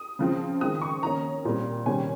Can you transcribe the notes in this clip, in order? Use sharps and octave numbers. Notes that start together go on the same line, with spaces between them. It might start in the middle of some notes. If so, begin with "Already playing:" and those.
Already playing: D#6
C#3 F3 C4
D#3 G#3 C4 D#6
C#6
D#3 A#3 C#4 A#5
A#2 G3 C4
C3 D#3 G3 C#4 G#5